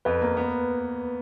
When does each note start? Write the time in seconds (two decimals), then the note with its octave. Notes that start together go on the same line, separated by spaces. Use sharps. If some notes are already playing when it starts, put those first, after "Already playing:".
0.05 F2 B4
0.21 A#3
0.37 B3